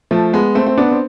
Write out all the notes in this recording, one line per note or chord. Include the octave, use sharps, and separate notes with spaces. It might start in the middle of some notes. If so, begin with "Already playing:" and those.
F3 A3
G#3 B3
A3 C4
C4
B3 D4
C4